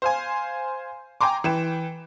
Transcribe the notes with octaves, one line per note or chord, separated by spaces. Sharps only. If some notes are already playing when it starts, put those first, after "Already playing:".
C5 F5 G#5
G5 G#5 A#5 C6 D6
E3 G5 E7